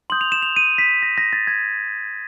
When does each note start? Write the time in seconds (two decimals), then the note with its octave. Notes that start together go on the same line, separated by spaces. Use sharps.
0.10 C6 D#6 G6 F#7
0.21 F7
0.32 E7
0.42 F7
0.56 D#7
0.78 B6
1.02 A#6
1.18 A#6
1.33 A6
1.47 G#6